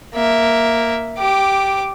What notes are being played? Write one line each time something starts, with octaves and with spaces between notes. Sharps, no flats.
A#3 E5
G4 D6